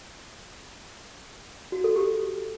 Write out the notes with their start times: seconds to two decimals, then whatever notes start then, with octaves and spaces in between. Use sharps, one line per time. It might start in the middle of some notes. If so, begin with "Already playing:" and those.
1.72 F#4
1.84 A4
1.96 G4